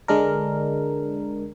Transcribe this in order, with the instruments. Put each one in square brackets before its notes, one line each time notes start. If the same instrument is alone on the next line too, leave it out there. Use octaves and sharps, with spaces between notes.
[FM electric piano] D3 G#3 D4 A#4